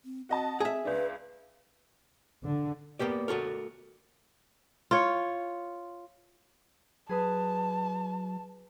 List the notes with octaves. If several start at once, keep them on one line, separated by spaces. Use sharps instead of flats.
C4
C4 F#4 D#5 A5
G#4 E5
C#2 D4 B4
D3
A#3 B3 G4 D5
A3 F#4 A4 A#4
F4 C#5
F#3 G#4 B4 A5 D#6